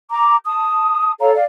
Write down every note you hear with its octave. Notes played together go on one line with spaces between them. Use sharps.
A#5 D6
A5 D#6
A4 C#5 F5 A#5
D5 F5